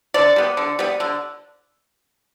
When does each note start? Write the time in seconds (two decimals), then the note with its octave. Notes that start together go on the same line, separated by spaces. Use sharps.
0.14 D3 D5
0.36 G3 B3
0.57 D3
0.79 G3 B3
1.00 D3